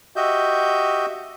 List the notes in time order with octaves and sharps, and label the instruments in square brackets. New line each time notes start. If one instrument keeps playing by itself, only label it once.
[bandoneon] F#4 G4 D#5 E5 G6